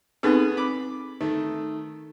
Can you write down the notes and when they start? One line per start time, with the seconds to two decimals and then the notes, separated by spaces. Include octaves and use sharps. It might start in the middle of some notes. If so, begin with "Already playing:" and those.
0.23 B3 C4 D#4 G#4 A4 B4
0.57 B5 D6
1.21 D#3 A3